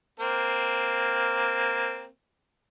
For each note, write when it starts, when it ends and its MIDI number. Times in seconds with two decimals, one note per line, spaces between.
0.20 2.06 58
0.20 2.06 60